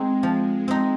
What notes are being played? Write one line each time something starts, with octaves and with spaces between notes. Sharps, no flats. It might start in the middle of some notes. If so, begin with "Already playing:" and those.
Already playing: G#3 C4 D#4
F3
C4 D#4